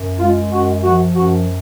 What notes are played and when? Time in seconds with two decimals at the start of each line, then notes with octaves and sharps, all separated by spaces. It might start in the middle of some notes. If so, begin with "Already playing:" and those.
Already playing: F#2
0.19 G#3 F4
0.52 F#2 F#4
0.83 F3 F#4
1.15 F#2 F#4